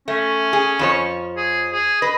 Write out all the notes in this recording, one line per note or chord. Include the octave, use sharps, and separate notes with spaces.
A3 C#4
G#4
F2 F3 C#5
G#4
G#4
B4 D#5